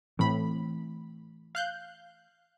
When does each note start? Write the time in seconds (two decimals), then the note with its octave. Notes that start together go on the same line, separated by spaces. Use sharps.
0.19 A2 E3 A3 C4 B5
1.55 F5 F#6 G6